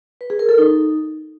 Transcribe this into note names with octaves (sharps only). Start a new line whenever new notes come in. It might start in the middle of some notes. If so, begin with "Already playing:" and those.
B4
G#4
A#4
A4
D#4